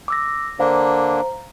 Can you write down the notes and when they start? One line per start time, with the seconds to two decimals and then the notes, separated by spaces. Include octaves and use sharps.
0.08 D6 E6 A#6
0.59 D3 A#3 D4 C5 F5 A#5